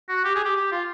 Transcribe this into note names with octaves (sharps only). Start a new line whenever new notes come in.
F#4
G4
G#4
G4
G4
F4